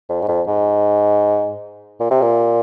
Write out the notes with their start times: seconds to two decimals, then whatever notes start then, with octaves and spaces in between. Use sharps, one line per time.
0.09 F2
0.21 G#2
0.28 F2
0.47 G#2
2.00 A#2
2.11 C3
2.22 A#2